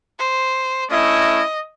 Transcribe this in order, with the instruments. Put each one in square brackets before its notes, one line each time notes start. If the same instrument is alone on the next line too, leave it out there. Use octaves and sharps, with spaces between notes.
[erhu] C5
[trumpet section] A3 C#4 E4 [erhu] D#5